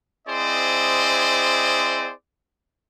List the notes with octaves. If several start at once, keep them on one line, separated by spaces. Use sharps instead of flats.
C4 E4 G#4 C5 D5 D#5